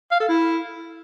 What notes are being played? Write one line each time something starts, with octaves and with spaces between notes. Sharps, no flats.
F5
A4
E4